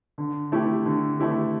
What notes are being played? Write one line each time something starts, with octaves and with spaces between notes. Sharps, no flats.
D3
A3 E4 G4
D3
A3 E4 G4